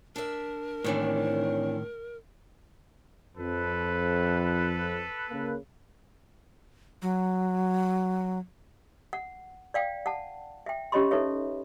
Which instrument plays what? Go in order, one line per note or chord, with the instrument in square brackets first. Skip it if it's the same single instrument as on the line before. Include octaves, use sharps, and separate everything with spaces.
[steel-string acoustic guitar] D4 E5 [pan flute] A#4
[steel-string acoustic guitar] D#2 E3 D4 [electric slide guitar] A2 D#3 [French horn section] C4 C#5
[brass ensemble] F2 [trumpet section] A4 B4
[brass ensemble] C#3 A#3
[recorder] F#3
[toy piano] F#5
D5 F5 G5
F#5 A5
E5 G5
C#4 G4 C#5 D#5 B5 C6
D#4 A4 B4 C#5 E5